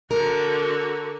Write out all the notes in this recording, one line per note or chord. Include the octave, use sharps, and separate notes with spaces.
D3 F#4 A#4